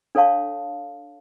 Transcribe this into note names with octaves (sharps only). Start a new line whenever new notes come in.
D4 A4 C#5 F5 A5 C#6